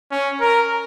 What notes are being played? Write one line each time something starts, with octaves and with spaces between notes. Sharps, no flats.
C#4
A#4